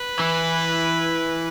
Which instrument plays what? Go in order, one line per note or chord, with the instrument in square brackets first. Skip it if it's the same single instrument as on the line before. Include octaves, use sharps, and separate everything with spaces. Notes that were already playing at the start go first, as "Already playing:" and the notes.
Already playing: [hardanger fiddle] B4
[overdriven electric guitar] E3